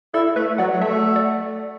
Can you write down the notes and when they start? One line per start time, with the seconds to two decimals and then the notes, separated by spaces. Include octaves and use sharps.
0.14 E4 A4 D5
0.36 A3 B4 E5
0.58 F#3 D5 F#5
0.73 F#3
0.81 A3 E5 A5
1.16 D5 F#5